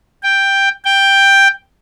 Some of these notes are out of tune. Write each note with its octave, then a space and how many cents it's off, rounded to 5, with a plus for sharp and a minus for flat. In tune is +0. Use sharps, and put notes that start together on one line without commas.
G5 +5
G5 +5